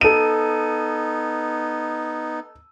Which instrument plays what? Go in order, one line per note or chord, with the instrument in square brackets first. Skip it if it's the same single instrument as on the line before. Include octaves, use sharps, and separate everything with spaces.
[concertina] B3 D#4 [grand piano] A4 D#7